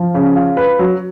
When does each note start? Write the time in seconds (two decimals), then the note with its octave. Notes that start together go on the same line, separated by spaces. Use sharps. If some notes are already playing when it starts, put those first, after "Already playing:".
Already playing: F3
0.14 C#3
0.36 F4
0.57 B4
0.79 F#3